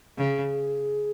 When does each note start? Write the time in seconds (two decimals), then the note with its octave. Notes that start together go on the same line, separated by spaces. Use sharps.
0.17 C#3 G#4